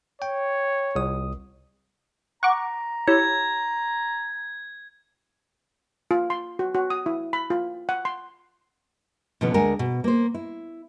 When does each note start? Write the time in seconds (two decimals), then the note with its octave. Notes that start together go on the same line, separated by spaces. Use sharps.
0.22 C#5 G5
0.95 C2 D#6
2.43 F#5 A#5 C#6 D6
3.08 E4 G4 C#5 G#6
6.11 F4
6.30 C6
6.59 F#4
6.75 F#4
6.90 D#6
7.06 E4
7.33 B5
7.50 F4
7.89 F#5
8.05 C6
9.41 B2 D3 F3 B3 C#4
9.54 D2 G#3 A#4 F#5 G#5
9.79 B2
10.04 A#3 C5
10.35 E4